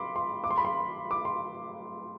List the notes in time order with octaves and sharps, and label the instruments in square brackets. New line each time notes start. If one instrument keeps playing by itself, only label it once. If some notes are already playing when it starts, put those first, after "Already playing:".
Already playing: [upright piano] B5 C6 D6
C6
D6
C6
B5
C6
D6
C6